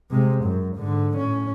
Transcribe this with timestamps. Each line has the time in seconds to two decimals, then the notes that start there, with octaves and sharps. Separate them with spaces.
0.11 C3 G#3
0.44 F#2
0.76 G#2 D3
1.17 A2 C#4